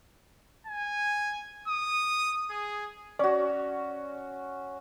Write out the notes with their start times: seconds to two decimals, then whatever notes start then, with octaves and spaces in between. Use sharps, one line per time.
0.67 G#5
1.68 D#6
2.50 G#4
3.19 C#4 F#4 D5